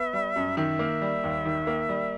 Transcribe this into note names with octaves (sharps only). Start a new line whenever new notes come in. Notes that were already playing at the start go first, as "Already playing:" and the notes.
Already playing: B3 E5
G3
F#2
D#3 E5
A#3
G3
D#2
D#3
A#3
G3